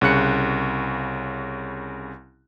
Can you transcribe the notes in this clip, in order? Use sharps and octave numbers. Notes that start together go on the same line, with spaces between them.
C2 C#3 F#6 C#7